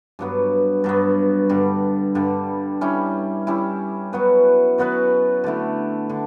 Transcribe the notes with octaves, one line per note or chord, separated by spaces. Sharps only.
G2 F#3 B3
G2 F#3 B3
G2 D3 G3
G2 D3 G3
G3 C#4 E4
G3 C#4 E4
F#3 B3 F#4 B4
F#3 B3 F#4 B4
D3 A3 E4
D3